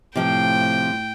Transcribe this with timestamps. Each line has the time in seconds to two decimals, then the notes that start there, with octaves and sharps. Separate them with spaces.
0.16 A2 C3 F3 G5